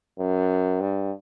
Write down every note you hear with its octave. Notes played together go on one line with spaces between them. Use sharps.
F#2
G2